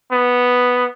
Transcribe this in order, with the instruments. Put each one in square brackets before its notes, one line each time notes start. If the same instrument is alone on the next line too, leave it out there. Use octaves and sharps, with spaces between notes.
[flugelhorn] B3